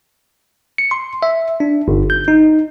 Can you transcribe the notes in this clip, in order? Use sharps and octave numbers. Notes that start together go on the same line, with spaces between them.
C#7
C6
E5
D4
G1
G6
D#4